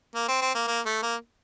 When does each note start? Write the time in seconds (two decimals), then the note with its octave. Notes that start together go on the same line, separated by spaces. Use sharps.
0.15 A#3
0.28 C4
0.42 C4
0.55 A#3
0.68 A#3
0.86 A3
1.03 A#3